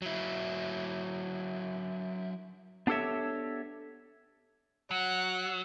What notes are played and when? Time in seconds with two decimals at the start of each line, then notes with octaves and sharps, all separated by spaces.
0.02 F#3 E4
2.87 B3 D4 G4 A4 C#5 E5
4.91 F#3 F#5